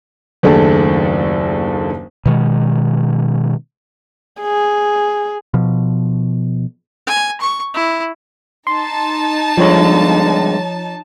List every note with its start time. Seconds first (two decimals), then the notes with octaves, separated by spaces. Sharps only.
0.43 F#1 D#2 A3 D4 G#4 A4
2.26 B2 D#3 G#3
4.42 G#4
5.54 B2 F3
7.07 G#5
7.40 C#6
7.74 E4
8.67 D#4 A5 C6
9.57 G2 D3 F3 G#3 C#5